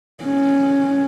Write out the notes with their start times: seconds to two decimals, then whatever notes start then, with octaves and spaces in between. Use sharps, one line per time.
0.24 C#4